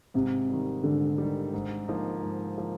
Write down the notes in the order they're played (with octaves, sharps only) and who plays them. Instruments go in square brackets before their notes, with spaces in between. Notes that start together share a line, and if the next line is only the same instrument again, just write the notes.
[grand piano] G#2 [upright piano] C3
[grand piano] D#3 G3
[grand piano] G#2 [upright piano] D3
[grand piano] D#3 G3
G#2
F3 A#3 D#4
G#2
F3 A#3